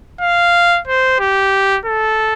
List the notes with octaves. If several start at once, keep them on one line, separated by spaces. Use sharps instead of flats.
F5
C5
G4
A4